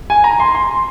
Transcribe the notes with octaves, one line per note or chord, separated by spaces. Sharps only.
G#5
A#5
C6
C6